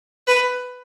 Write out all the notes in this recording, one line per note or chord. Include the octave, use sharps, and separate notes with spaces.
B4